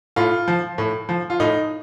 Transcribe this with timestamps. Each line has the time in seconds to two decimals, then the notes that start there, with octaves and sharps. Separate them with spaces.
0.16 A2 F4
0.48 F3
0.78 A2
1.09 F3
1.30 F4
1.40 A2 D#4